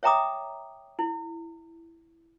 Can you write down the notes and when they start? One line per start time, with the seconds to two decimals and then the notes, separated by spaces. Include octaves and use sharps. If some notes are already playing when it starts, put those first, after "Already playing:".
0.03 C#5 E5 G5 A#5 D6 D#6
0.99 E4